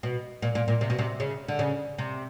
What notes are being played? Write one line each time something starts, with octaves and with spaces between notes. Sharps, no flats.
B2
A#2
A#2
A#2
C3
B2
C3
C#3
D3
C#3
C3